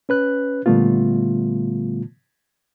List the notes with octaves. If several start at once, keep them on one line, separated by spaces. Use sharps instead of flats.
C#4 B4 F#6
A#2 D3 G3 A3 B3 F4